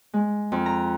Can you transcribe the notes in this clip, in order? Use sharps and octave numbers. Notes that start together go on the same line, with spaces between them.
G#3
F2
A#5